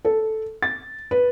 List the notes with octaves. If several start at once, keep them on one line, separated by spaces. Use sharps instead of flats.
A4
A6
B4